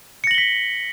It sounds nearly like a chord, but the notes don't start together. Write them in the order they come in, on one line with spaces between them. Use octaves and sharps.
C#7 A#6 F#7 G7 B6